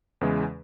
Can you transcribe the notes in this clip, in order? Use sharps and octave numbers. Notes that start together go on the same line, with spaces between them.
E2 C#3 E3 G#3 C#4